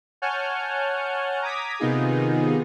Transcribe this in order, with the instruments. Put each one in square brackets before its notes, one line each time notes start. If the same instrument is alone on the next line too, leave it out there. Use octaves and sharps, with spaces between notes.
[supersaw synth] C#5 F#5 G#5 A5 F6 G6
A#5 D6 D#6 G#6 B6
C3 D#3 B3 D#4 F4 G#4